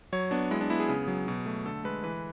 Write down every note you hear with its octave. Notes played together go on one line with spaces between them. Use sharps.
F#3 C#5
B3 D4
G#3 E4
D4
B3 E4
G#4
C#3
F#3
B2
A3
D3 A4
G#3 B4
E3 B4